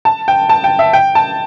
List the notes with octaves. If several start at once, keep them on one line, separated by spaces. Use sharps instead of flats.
A5
G5
A5
G5
E5
G5
A5